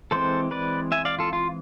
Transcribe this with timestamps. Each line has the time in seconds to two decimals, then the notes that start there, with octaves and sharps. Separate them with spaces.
0.11 E3 G#3 C4 A4 C5
0.51 B4 D5
0.92 E5 G#5
1.05 D5 F5
1.19 F4 A4
1.33 F4